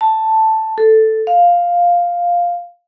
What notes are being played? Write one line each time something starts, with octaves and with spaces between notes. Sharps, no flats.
A5
A4
F5